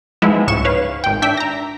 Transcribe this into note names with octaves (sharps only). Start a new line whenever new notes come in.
F3 G#3 B3 D#4 E4 E5
C#2 G#2 C#6 E7
B4 C#5 F5
G#1 G5
D4 E5 G5 B6
A#5 A#6